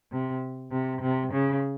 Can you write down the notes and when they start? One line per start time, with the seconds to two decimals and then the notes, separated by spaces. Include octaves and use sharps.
0.12 C3
0.72 C3
1.02 C3
1.32 C#3